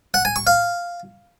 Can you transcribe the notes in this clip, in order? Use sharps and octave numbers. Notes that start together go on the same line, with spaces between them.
F#5
G#5
C#6
F5